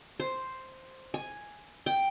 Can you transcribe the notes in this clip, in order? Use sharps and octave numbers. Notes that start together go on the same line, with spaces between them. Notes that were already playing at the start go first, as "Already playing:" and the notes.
C5
G#5
G5